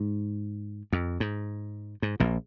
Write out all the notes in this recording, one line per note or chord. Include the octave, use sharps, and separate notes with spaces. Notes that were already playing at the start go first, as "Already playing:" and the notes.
Already playing: G#2
F2
G#2
G#2
A#1 A#2